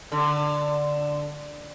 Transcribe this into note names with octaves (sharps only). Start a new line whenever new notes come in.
D3